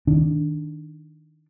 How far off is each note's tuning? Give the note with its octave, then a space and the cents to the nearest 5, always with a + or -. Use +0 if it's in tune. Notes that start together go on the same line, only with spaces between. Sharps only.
D#3 +5 D4 +0